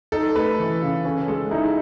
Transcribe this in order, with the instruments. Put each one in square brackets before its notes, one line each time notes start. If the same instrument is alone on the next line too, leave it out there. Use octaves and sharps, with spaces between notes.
[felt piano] D#4 [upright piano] A4
[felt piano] A3 [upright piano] B4
[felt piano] E3
C#3
C#4
[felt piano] G#3 [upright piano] A4
[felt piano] D#4 [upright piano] E4